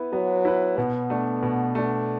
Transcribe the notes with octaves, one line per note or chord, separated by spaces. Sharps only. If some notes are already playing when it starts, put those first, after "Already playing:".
Already playing: B3 E4 B4
F#3 B3
E4 B4
B2 B3
A3 D4
B2
A3 D4